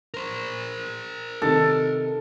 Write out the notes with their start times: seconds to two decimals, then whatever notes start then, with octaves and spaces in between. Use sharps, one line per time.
0.14 A#4 C5
1.42 C3 D#3 G4 A4